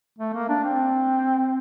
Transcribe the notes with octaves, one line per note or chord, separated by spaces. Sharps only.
A3
A#3
D4
C4